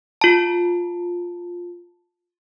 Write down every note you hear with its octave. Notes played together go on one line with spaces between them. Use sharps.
F4 A5